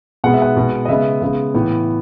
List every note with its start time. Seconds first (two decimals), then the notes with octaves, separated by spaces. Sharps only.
0.24 B2 G#3 B3 F#5
0.34 E5
0.42 F#5
0.56 B2 G#3 B3
0.85 D#5
0.88 C#3 G#3 B3 E5
1.21 C#3 G#3 B3
1.54 A2 E3 B3